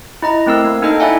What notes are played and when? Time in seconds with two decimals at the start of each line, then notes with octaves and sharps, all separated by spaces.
0.22 E4 D#5 A#5
0.46 A3 C4 A#4 E6
0.65 A#3
0.82 A#3 D4 D#4 A4 D#5 G5
1.00 E4 D5 E5 F#5 G#5